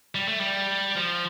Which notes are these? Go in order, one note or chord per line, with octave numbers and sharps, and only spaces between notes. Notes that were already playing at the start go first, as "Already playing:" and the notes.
G3
A3
G3
F3